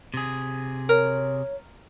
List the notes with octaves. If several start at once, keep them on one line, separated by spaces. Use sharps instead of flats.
C3 G#4
A#4 C#5